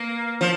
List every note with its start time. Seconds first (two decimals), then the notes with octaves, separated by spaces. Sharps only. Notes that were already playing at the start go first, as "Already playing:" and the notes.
Already playing: A#3
0.41 F3